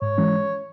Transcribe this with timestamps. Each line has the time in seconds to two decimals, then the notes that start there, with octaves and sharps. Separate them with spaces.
0.02 G#2 C#5
0.18 E3 G#3 C#4